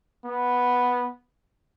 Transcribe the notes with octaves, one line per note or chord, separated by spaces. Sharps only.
B3